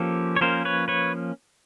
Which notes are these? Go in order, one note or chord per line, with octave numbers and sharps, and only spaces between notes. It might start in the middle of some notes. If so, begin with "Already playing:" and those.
Already playing: F3 A#3 C#4 G4 A4
C#5
F3 A#3 C#4 A#4 C5
B4 C#5
B4 C#5